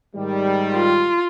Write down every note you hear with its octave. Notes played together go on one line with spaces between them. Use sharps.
G#2 D#3 G3
F4